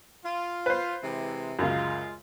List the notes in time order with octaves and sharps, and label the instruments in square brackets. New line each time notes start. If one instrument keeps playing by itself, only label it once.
[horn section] F4
[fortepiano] B4 C5
[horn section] C3 E3 G#3
[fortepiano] C#2 F#2 [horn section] G#3 F4